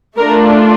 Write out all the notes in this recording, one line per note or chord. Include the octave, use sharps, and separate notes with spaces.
A3 D4 F4 A#4